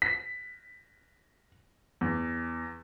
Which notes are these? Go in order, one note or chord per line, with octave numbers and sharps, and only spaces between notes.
B6
E2